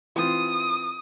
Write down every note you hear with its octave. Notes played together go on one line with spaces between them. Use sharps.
E3 C4 F4 D#6